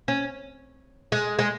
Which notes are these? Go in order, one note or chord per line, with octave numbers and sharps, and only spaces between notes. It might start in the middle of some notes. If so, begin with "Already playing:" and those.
C#4
G#3
G#3